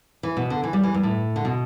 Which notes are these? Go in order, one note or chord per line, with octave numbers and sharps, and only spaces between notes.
E3
B2
D3
E3
G3
E3
G2
A2
D3
B2